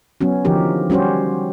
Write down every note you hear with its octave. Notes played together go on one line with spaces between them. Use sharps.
F#3 B3 C#4 F#4
D3 E3 F3 D#4 G4 A#4
G3 C#4 F#4 G4 C5